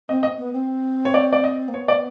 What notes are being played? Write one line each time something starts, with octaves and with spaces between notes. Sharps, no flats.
C4 D#5
D#5
B3
C4
C#5
D5
D5
D#5
A#3
B3 C#5
D5